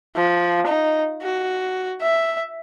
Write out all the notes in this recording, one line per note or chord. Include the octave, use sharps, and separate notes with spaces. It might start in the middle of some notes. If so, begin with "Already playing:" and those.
F3
D#4
F#4
E5